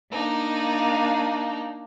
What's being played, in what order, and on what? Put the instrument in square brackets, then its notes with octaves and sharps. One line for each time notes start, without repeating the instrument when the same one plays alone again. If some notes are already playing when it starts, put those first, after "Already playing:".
[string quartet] A#3 D4 D#4